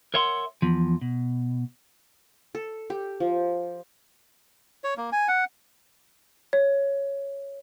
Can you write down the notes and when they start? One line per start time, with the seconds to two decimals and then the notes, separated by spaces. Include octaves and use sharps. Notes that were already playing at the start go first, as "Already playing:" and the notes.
0.14 A#4 C#5 E5 F#5 C6
0.62 E2 F3
1.01 B2
2.55 A4
2.90 G4
3.20 F3
4.84 C#5
4.98 A#3
5.12 G#5
5.28 F#5
6.53 C#5